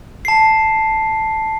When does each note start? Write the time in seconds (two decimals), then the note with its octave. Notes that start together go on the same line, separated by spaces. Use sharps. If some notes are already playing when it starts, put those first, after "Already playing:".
0.25 A5 C7